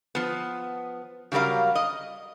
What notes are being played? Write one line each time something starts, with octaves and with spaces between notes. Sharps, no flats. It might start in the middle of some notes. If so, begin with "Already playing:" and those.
F3 B3
C#3 F#3 G3 A#4 F5
D#5